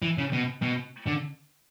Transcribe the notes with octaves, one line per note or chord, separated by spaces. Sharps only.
E3
C#3
B2
B2
D3